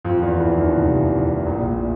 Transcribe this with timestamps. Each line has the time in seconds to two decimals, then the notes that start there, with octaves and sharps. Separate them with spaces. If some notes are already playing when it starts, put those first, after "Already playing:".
0.05 F2 F3
0.22 E2 E3
0.40 E2 E3
0.57 D#2 D#3
0.75 C2 C3
1.11 C2 C3
1.46 A#1 A#2
1.71 A2